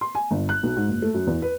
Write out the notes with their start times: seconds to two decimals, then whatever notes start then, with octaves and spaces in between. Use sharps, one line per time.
0.01 C6
0.15 G#5
0.31 G1
0.49 F#6
0.63 B1
0.76 G#2
0.88 F#1
1.02 A3
1.14 F#2
1.27 E2
1.42 B4